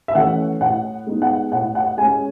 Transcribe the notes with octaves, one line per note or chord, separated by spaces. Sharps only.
E5
E3 A3 C#4 F#5
A2 F#5
G#3 B3 D#4
F#5
A2 F#5
F#5
G#3 C#4 G#5